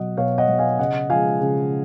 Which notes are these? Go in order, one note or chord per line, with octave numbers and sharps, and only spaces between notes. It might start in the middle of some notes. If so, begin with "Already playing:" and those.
Already playing: B2 F#3 D#5 F#5
B2 C#5 F5
D#5 F#5
F#3
F5 G#5
C#3 D#5 F#5
F3 G#3 F5 G#5
C#3